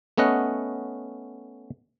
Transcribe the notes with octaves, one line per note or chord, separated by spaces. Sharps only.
A3 B3 C#4 D#5 F#5